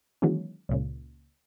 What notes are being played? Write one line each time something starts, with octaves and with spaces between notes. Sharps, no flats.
D#3 E3 F#3 G#3 A#3 C#4
C#2 A#2 C#3